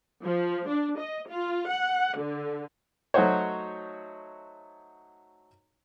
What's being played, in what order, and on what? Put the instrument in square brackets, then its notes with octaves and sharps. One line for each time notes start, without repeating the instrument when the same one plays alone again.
[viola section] F3
D4
D#5
F4
F#5
D3
[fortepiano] F#3 A3 D#4 F#4 C5 C#5